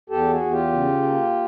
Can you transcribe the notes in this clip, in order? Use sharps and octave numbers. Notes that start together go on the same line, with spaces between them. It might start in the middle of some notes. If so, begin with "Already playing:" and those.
E2 G4 A4
F#4 G#4
E2
F4 G4
C#3
A#3